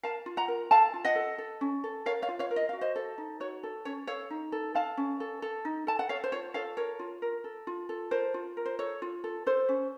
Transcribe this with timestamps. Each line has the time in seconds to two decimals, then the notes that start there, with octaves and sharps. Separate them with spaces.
0.03 A#4 F5 A5
0.26 F4
0.37 F#5 A#5
0.48 A#4
0.71 A4 F5 A5
0.94 F4
1.05 D#5 F#5
1.15 A4
1.38 A4
1.61 C#4
1.84 A4
2.06 A#4 C#5 F5
2.22 C#5 F5
2.28 F4
2.39 C#5 F5
2.51 A#4
2.56 D#5
2.69 F#4 F5
2.81 C5 D#5
2.96 A4
3.18 D#4
3.40 F#4 C#5
3.63 A4
3.85 C#4 C#5
4.07 A4 C#5 F5
4.30 D#4
4.52 A4
4.75 A4 F5 A5
4.97 C#4
5.20 A4
5.42 A4
5.65 D#4
5.87 A4 A5
5.99 F#5
6.09 A4 C#5 F5
6.24 C5
6.32 F4 C#5
6.54 A4 C#5 F5
6.77 A#4 C#5
6.99 F4
7.22 A#4
7.44 A4
7.67 F4
7.89 A4
8.11 A#4 C5
8.34 F4
8.57 A#4
8.66 C5
8.79 A4 C#5
9.02 F4
9.24 A4
9.46 A4 C5
9.69 C#4